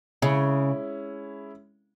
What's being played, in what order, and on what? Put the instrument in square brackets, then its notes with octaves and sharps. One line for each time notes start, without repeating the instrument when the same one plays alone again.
[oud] C#3 [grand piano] G#3 C#4 E4